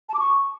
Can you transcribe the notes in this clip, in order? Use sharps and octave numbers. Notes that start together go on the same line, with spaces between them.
A5
D6
C#6